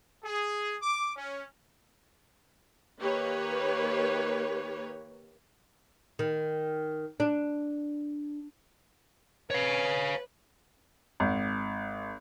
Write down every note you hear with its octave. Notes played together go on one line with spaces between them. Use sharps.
G#4
D6
C#4
D#3 A#3 G4 B4 C#5
D#3
D4
B4 C#5 F5
G#1